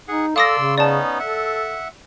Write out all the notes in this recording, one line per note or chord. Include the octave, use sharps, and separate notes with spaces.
D#4 G#4 F#5
A4 D5 F5 C6 D#6 E6 A#6
C#3
B3 C#4 D#4 D5 A5
A4 E5 F#5